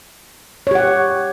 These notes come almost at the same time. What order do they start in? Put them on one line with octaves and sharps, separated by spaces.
C#5 G4 F#5